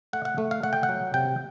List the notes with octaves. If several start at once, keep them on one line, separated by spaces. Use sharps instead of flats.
A3 F#5
F#5
A3
F5
A3 F#5
G5
F#5
F#3
C3 G5